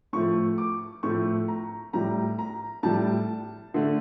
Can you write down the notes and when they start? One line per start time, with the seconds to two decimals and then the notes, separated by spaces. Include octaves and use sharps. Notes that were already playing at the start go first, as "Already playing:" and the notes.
0.13 A2 F3 A3 C#6
0.58 D6
1.03 A2 F3 A3 C#6
1.48 A#5
1.93 A2 G3 A#5
2.39 A#5
2.83 A2 G3 A5
3.74 D3 A3